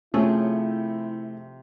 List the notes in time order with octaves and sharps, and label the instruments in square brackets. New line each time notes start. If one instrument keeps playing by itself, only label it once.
[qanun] C3 F3 G#4 [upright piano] A3 [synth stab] C#4 A4 [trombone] E4